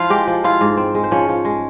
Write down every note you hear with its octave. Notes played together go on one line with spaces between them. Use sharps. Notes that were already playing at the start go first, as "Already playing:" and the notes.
Already playing: F3 E4 F4 F5
G#3 G4 G5
F3
E4 F4 F5
G#2
C4
G#3
C5
F3 C#4 C#5
F3
G#3